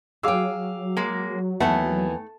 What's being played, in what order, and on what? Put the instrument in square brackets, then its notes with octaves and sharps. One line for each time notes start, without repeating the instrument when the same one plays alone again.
[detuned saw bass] F#3 [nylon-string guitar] G#4 G5 [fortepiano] F5 D6 E6
[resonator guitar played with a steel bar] G#3 A#3
[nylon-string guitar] D#2 E3 F#5 [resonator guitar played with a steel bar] A3 [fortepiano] B3 E5